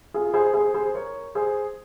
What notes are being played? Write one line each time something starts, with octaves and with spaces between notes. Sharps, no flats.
F4 G#4
G#4 C5
G#4 C5
G#4 C5
A#4 C#5
G#4 C5